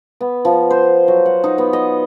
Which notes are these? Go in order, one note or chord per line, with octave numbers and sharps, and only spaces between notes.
B3
F3
C5
F#3
F#5
D#4
B3
D#5